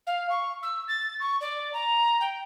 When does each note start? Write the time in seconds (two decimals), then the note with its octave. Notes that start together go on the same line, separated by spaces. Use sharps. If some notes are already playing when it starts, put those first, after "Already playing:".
0.06 F5
0.30 C#6
0.62 E6
0.88 A6
1.20 C#6
1.41 D5
1.73 A#5
2.20 G5